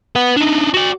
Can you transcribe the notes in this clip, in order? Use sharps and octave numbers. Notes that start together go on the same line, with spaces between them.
B4 F#5
D4 D#4
F#4 D5